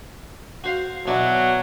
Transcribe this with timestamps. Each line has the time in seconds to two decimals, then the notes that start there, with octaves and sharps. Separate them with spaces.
0.64 F#4 C5 F5
1.07 B2 F#3 E4 D5